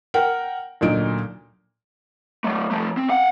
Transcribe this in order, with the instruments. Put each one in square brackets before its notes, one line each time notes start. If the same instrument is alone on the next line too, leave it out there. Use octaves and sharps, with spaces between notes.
[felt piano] A#4 F#5 G5
D2 A#2 F#3 D#4 D7
[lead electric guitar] F#3 A3
F3 A3
C4
F5 F#5